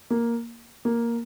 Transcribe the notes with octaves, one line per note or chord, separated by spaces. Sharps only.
A#3
A#3